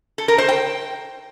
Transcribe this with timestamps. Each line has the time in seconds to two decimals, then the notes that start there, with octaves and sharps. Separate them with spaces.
0.18 A4
0.28 A#4
0.38 C5
0.48 G5